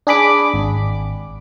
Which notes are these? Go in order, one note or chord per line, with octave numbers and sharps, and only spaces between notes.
D4 G#4 B5 D6
G#1